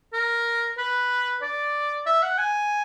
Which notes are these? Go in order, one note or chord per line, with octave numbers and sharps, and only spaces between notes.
A#4
B4
D5
E5
F#5
G#5